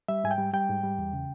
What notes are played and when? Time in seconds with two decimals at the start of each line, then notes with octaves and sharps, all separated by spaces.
0.08 G3 E5
0.24 G#2 G#5
0.31 G5
0.38 G3
0.53 G3 G5
0.69 G#2
0.83 G3
0.98 E2
1.13 C#3